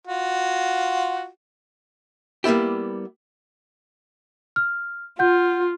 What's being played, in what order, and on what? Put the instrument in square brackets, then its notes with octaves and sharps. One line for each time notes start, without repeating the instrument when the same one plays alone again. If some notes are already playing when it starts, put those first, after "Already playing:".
[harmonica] F4 F#4
[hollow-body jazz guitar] G3 A#3 B3 E4 G4
[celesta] F6
[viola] F4 [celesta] F#5 G6